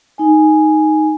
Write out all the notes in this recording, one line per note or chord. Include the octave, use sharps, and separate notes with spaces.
D#4 G#5